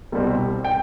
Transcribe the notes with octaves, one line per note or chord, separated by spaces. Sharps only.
C2 B2 G3 C4
G5